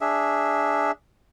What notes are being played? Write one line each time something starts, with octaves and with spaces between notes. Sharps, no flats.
D4 G#4 E5